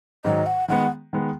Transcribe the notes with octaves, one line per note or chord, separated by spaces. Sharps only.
G#2 D#3 F#3 D#5
F#5
D#3 G#3 B3 F#5
D#3 G#3 B3